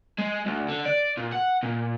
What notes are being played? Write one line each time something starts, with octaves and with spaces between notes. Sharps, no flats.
G#3
D2
D3
D5
A#2
F#5
A#2